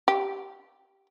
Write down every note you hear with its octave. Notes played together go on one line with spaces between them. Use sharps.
G4